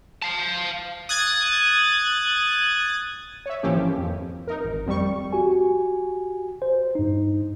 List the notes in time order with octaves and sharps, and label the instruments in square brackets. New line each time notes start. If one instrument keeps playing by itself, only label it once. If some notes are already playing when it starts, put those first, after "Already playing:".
[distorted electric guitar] F5 A5
[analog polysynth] D#6 F#6 G#6 A6
[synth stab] C#5 E5
G#1 E3 F3 A#3 C#4 G4
F2
D#4 A#4
G#1
F2 G3 C#6
[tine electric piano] F#4 G4 G#5
C5
G2 D#4